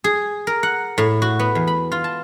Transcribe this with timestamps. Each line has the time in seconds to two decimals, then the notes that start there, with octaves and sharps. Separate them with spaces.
0.04 G#4
0.47 A#4
0.63 F#5
0.98 A2
1.22 F#4
1.39 B3
1.55 E2
1.67 B5
1.92 F4
2.04 A5